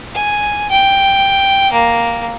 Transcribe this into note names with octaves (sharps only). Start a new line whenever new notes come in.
G#5
G5
A#3